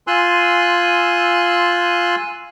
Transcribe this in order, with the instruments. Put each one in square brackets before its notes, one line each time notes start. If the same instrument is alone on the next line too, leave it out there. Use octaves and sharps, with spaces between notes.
[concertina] F4 G#5 C6 E6 F#6